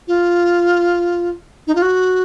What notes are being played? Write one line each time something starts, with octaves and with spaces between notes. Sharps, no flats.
F4
D#4
F4
F#4